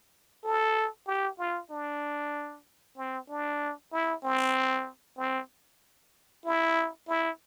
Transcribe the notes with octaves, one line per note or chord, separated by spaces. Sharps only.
A4
G4
F4
D4
C4
D4
E4
C4
C4
E4
E4